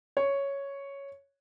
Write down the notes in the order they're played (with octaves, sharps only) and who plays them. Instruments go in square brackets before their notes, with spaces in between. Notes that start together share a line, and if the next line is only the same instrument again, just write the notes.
[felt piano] C#5